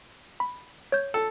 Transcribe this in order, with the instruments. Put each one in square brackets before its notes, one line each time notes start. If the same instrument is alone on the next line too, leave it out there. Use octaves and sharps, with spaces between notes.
[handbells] B5
C#5 G6
[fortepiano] A4